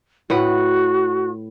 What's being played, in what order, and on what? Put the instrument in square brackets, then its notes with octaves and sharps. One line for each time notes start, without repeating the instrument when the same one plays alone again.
[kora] A2 B4 F#5 [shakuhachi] F#4